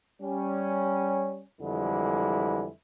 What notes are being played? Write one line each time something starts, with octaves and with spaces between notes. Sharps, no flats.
G3 C#4
F2 D3 E3 G3 G#3 E4